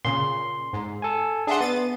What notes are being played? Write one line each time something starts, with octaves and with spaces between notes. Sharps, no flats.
A#2 C#3 C6
G#2
A4 G#5
D4 G#4 E5 F#5 C6
B3 A6 D#7